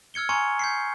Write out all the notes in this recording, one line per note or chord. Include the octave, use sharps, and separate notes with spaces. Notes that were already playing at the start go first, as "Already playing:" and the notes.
E6 F6 G#6 C#7 G7
G#5 A#5 C6 C#6 G#6 C#7
G6 B6 C7